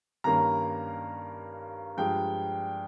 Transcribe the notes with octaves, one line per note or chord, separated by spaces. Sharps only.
G2 D#3 A#3 C#4 A#5
G2 F3 G#3 G5